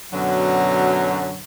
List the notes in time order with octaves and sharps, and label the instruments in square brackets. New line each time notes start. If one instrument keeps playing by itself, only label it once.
[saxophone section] F#2 B2 D3 F#3